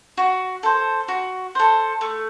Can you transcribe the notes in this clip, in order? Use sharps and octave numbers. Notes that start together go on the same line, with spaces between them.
F#4
A4 C5
F#4
A4 C5
A3